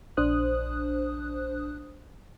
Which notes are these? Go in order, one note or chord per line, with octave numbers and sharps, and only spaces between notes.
A#1 D4 C5 D#6 F#6